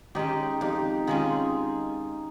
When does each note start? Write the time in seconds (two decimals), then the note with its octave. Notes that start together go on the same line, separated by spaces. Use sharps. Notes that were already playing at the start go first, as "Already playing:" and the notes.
0.15 D#3 G#3 C#4 D#4 G4
0.61 F2 D#4 G4
1.07 D#3 G#3 C#4 F4 G#4